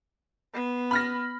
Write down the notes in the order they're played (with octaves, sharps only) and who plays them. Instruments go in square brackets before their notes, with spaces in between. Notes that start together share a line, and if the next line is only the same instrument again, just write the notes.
[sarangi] B3
[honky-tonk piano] B5 F6 A#6